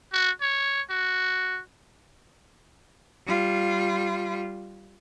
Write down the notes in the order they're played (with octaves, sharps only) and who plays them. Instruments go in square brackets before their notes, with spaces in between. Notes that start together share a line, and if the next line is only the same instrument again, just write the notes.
[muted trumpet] F#4
C#5
F#4
[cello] G3 F4